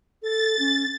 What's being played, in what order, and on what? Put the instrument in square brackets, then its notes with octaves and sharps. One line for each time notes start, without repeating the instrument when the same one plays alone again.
[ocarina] A4 [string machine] A6
[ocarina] C#4